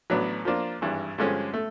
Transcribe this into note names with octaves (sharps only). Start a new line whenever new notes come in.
A1 A2 F#3 B3 D4
F3 A#3 D4 F4
G#1 G2 E3
G2 D3 F3 G#3 C#4
A3